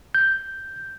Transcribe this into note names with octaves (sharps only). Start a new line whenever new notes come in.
G6